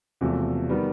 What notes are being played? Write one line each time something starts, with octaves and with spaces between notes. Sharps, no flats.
E1 E2 C3 F3 A3
D#3 G3 B3